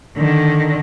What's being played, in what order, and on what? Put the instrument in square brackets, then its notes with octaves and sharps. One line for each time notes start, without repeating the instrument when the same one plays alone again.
[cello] D3 D#3